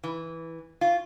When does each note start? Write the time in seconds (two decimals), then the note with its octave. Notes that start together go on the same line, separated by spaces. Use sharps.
0.04 E3
0.81 F4